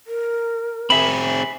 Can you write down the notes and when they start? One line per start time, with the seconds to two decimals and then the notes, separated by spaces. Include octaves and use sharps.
0.07 A#4
0.90 C4 G#4 E5 B5